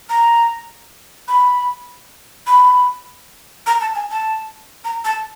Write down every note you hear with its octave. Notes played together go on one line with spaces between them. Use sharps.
A#5
B5
B5
A#5
A5
G#5
A5
A#5
A5